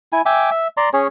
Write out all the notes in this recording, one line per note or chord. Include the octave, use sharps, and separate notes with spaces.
E4 G#5
E5 G5 G#5 D6
E5
D5 A#5 C6
C#4 G#4 C#5